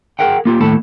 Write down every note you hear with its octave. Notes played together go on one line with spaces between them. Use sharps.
G#4 A#4 F#5 G5
A#3 F4 G4
D#2 A2 A4 A5 B5